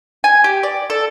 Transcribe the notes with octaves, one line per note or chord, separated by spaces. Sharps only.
G#5
G4
D5
A4